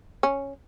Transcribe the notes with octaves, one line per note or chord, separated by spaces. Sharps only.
C#4